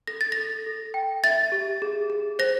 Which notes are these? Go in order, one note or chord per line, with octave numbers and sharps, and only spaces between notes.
A4 A#6
A6
A#6
A4
A4
G5
E5 A6
G4
G#4
G#4
C5 A#6